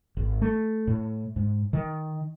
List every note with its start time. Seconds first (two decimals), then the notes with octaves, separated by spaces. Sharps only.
0.17 G#1
0.42 A3
0.87 A2
1.36 G#2
1.73 D#3